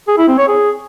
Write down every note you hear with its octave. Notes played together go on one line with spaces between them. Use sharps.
G#4
E4
C4
C#5
G#4